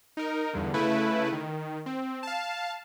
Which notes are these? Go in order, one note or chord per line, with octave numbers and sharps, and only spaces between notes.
D#4 A#4
E2 G2 D3
C#3 A3 E4 B4
D#3
C4
F5 A5